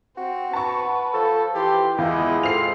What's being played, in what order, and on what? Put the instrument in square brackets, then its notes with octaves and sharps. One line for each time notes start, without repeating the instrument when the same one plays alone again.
[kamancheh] C4 [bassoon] F#4
[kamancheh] B4 [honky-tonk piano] A5 C#6
[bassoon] F3 [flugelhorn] A4
[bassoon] E3 [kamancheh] F4 C6 [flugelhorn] G4
[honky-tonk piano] E2 [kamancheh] G#3 D#5 [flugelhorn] E4 [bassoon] F4
[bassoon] C4 [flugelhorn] F4 [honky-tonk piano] A4 C7 F7